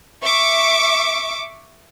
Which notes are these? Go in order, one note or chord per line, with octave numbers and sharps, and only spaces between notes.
E5 C#6 D6